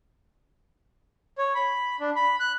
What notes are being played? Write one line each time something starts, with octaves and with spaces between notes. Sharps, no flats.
C#5
B5
D4
B5
F#6